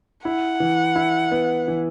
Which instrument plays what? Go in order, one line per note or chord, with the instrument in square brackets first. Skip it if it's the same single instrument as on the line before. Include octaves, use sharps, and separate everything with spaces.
[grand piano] E4 [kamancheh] F#5
[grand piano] E3
E4
B3
E3